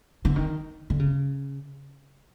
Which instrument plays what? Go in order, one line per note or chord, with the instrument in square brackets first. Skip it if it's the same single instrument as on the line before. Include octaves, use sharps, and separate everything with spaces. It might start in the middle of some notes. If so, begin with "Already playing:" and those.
[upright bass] D3
D#3
D3
C#3